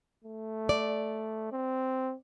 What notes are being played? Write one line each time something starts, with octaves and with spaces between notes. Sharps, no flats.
A3
D5
C4